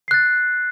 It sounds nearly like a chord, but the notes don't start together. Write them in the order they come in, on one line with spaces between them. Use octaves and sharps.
C7 F#6 A6